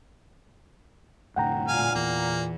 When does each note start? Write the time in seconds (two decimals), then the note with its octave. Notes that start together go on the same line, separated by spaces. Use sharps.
1.36 F1 A2 D3 F#5 G5 A#5
1.68 A#2 F5 G#5
1.95 E2 E3 A#3